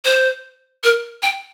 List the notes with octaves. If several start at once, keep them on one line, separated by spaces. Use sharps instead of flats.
C5
A#4
G5